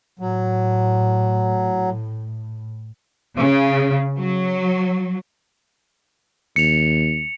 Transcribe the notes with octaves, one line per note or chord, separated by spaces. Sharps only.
A2 F#3
C#3
F#3
D#2 C#7 F7